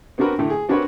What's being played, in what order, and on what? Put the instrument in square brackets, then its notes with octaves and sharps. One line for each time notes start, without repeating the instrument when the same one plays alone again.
[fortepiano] B3 C4 D4 F#4 A#4 B4
A2 D3 A3
G#4
C4 D4 F#4 A#4 B4 C#5